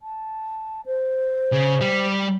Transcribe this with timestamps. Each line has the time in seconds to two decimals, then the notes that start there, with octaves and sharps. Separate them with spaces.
0.01 A5
0.86 C5
1.53 C#3
1.81 G3